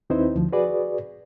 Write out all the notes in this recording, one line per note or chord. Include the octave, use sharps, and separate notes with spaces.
D#2 C4 D#4 E4 B4 C5
D2 F3
F#4 G#4 B4 D5